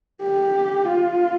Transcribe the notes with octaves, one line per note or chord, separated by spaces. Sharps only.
G4
F4